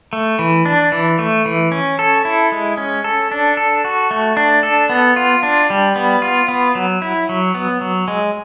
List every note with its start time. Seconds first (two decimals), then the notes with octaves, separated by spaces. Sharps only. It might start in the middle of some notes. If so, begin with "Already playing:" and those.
0.13 A3
0.39 E3
0.65 D4
0.92 E3
1.19 A3
1.46 E3
1.72 C#4
1.99 A4
2.25 E4
2.52 G#3
2.77 C#4
3.04 A4
3.31 D4
3.57 A4
3.85 F#4
4.11 A3
4.37 D4
4.63 A4
4.89 B3
5.16 F4
5.43 D4
5.70 G3
5.96 B3
6.22 F4
6.48 B3
6.75 F#3
7.02 E4
7.29 F#3
7.55 B3
7.81 F#3
8.08 G#3